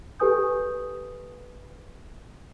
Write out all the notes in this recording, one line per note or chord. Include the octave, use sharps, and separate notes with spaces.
G4 A4 B4 G#5 D#6 G6